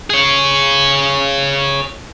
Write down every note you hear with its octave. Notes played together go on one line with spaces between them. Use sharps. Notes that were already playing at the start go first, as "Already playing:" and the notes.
G#4 C#5